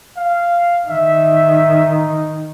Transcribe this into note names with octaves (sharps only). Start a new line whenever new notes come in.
F5
D#3 E5
D#4